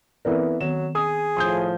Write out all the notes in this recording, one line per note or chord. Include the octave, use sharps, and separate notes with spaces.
E3 B3 C4 A4 A#4 D5
D#3 F#3 B3 E7
G#4 D#6
A2 F3 C6 D#6 G6